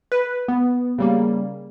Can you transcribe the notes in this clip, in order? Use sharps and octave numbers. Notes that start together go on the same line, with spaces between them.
B4
B3
C#3 G3 A#3